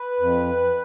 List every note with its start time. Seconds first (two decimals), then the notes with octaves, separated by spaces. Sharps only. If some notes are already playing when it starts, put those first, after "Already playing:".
Already playing: B4
0.20 F2